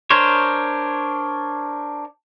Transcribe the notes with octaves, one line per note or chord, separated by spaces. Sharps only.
D4 A#4 C5 C#5